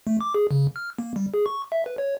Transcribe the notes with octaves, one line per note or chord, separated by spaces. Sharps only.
A3
D6
G#4
C#3
F6
A#3
G3
G#4
C#6
E5
B4
C#5